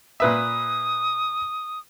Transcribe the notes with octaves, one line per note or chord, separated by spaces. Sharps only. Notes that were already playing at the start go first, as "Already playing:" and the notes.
A#2 B4 E5 D#6